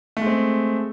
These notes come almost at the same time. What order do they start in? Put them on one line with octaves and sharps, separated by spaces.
A3 G#3 C4